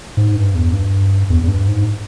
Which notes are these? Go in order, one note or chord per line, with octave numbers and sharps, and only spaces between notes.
G#2
G2
E2
G2
E2
E2
G2
G#2